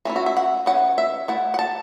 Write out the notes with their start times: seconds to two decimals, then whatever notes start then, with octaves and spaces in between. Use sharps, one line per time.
0.05 A3 C#4 E4 F#4
0.16 F#4
0.26 E5
0.37 F#5
0.66 E3 C#4 F#5
0.98 E5
1.28 A3 E4 F#5
1.54 F#5
1.59 A5